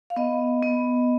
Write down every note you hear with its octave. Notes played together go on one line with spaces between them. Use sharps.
F5
B3 D#5
B3